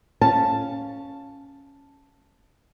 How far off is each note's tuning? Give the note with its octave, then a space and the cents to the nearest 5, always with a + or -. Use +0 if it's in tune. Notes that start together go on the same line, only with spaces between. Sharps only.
C#4 +0 F5 +0 A5 +0